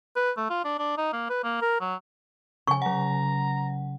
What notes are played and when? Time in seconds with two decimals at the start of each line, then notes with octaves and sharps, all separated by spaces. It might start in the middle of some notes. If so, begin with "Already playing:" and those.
0.16 B4
0.37 A3
0.50 F4
0.65 D4
0.79 D4
0.97 D#4
1.13 A#3
1.30 B4
1.44 A#3
1.62 A#4
1.81 F#3
2.67 C#3 G#5 C#6
2.82 F#3 F#5 A#5